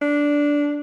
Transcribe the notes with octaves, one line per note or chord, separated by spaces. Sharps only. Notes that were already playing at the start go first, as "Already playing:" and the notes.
D4